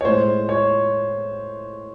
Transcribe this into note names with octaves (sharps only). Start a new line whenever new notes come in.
C#5
A2 G#3 C5
C#5